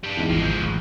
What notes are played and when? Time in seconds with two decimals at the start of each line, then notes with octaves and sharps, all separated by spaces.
0.04 G3 D4
0.17 E2 G#2
0.30 G#1 F3 G#3
0.44 G6
0.61 A1 D#2